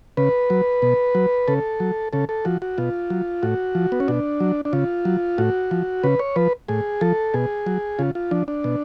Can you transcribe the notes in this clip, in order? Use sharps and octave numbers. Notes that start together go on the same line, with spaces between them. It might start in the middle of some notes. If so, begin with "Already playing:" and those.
C#3 B4
F#3
B2
F#3
C#3 A4
F#3
C#3 A4
A4
F3 F#4
F#4
B2 F4
F#3
A2 F#4
F3
B3
C#4
B2 D4
F#3
D4
C#3 F4
F#3
A2 F#4
F3
C#3 B4
C#5
F3 B4
A2 G#4
F3 A4
B2 G#4
F#3
C#3 F4
F4
F3 D4
D4
B2